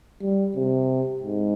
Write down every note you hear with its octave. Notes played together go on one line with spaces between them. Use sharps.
G3
C3
G#2